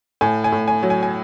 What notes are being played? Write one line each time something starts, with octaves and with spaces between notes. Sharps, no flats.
A2 G#5
G#5
A2
G#5
F#3
G#5
G#5